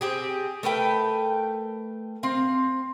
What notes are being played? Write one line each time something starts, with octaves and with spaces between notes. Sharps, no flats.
C4 G4 G#4
A3 A#4 B4 G5
C4 F5